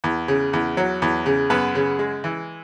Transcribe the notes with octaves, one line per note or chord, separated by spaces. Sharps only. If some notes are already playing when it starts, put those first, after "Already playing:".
E2
C#3
E2
F#3
E2
C#3
F#2 B3 B4
C#3
G#3
E3